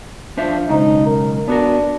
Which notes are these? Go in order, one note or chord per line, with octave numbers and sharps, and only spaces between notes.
F3 D4 C5 E5
B1 C#3 G#3 D#4
A#4
B3 D4 F#4 A#4